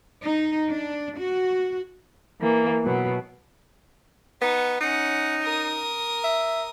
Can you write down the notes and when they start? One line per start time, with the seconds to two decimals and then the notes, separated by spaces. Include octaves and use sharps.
0.23 D#4
0.68 D4
1.19 F#4
2.40 E3 A#3
2.84 B2 F#3 B3
4.42 B3 D#4
4.81 C#4 D#4 F#5
5.42 A#4 D#6
6.24 E5